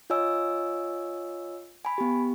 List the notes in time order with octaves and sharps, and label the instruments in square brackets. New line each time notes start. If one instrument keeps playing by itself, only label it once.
[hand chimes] F4 C#5 D#5 G#5 E6
G#5 B5
B3 G4